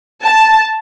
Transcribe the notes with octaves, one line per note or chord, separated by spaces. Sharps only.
A5